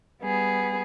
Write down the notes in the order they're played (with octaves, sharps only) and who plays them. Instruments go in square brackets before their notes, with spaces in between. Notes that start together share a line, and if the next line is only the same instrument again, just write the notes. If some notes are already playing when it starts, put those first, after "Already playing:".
[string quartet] G3 B3 G#4